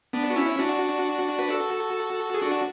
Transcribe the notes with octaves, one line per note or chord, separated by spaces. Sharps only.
B3 D4
F#4
C#4 E4
D4 F#4
B4
F#4 A4
G#4
D4 F#4